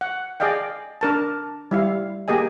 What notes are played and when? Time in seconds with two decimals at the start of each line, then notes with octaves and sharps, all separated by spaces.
0.01 F#5
0.40 G#4 D5 D#5 F5 G5
1.01 D4 A#4 A5
1.71 G3 E4 F5
2.28 A#3 G4 G#4 D#5 G#5